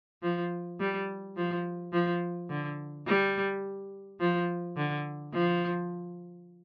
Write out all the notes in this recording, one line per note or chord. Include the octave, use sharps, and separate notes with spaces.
F3
G3
F3
F3
D3
G3
F3
D3
F3